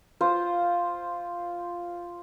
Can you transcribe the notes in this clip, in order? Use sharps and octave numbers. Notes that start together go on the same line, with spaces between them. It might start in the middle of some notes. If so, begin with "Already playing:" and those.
F4 C5